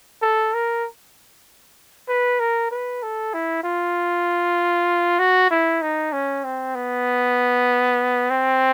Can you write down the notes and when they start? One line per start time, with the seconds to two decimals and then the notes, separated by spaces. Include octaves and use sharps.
0.22 A4
0.54 A#4
2.08 B4
2.39 A#4
2.71 B4
3.03 A4
3.34 E4
3.64 F4
5.19 F#4
5.50 E4
5.82 D#4
6.12 C#4
6.44 C4
6.75 B3
8.30 C4